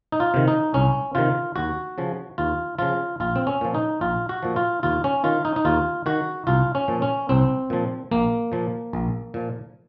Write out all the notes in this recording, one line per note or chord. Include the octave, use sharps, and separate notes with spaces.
D#4
F4
C3 D#3
D#4
C2 C#4
C3 D#3 F4
D#2 F#4
C#3 F3
D#2 F4
C#3 F3 F4
A#1 F4
C4
C#4
A#2 F3
D#4
A#1 F4
F#4
A#2 F3
F4
D#2 F4
C#4
D#3 F4
D#4
D#4
D#2 F4
D#3 F#4
C2 F4
C#4
A#2 F3
C#4
C2 C4
A#2 F3
A#1 A#3
A#2 F3
A#1
A#2 F3